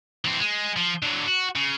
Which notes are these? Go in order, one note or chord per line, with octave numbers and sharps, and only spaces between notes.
E3 C4
G#3
F3
D3 F#3
F#4
C#3